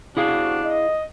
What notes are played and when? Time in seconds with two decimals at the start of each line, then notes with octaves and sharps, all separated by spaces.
0.17 C3 D4 E4 F#4 G#4 F5
0.65 D#5